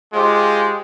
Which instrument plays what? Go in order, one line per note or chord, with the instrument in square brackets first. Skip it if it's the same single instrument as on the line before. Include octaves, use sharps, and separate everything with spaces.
[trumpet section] G#3 [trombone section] F4 G4 C5